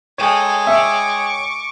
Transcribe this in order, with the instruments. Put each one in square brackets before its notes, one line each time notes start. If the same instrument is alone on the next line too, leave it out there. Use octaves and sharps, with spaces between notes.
[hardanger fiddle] G#3 [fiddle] A4 [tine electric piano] C#5 G5
[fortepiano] E5 [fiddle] C#6 D6